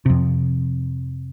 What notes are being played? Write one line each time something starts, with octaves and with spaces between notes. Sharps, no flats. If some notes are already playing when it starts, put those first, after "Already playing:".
F2 C3